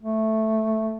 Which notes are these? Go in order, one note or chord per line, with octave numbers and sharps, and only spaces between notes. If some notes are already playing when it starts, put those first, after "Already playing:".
A3